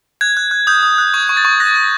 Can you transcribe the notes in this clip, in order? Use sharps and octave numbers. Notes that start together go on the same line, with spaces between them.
F#6 G#6
F#6
F#6
D#6 G6
D#6
F#6
C#6 G#6
C#6
A6
C#6
F#6 A#6
F#6